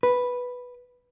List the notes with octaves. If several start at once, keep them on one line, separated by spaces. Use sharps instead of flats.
B4